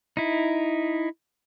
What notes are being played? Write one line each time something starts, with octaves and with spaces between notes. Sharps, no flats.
D#4 E4